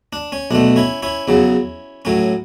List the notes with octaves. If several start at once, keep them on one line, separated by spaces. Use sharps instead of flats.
D4
C#4
B1 B2 A3 D4
C#4 E4
C#4 E4
E2 C#3 F#3
A2 F#3 C#4